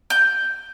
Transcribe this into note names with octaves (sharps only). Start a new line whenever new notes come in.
G6